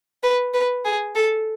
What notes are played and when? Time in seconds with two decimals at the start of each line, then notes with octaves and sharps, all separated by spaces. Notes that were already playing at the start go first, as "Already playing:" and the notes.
0.23 B4
0.54 B4
0.85 G#4
1.15 A4